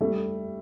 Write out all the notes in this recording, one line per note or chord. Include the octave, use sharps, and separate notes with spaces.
G3 A3